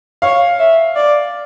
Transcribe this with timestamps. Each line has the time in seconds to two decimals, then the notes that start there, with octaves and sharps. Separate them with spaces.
0.22 C#5 F5
0.59 E5
0.96 D5